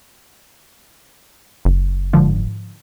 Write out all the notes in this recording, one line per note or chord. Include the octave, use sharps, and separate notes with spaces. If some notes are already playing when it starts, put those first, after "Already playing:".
F#1
G#2 D3 F3